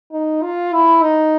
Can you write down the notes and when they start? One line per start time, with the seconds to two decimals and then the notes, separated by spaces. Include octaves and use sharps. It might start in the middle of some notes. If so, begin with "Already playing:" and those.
0.12 D#4
0.42 F4
0.73 E4
1.03 D#4